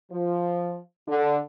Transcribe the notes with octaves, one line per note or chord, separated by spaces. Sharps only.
F3
D3